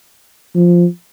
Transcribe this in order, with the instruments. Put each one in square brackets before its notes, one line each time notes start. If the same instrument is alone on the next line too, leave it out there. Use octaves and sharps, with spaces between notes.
[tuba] F3